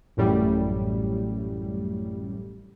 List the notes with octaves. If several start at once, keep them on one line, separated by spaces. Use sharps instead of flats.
A1 F#2 A2 G3